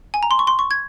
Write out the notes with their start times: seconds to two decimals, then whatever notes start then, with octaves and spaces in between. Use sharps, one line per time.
0.14 G#5
0.23 A#5
0.31 C6
0.39 C#6
0.47 C6
0.59 C#6
0.71 G#6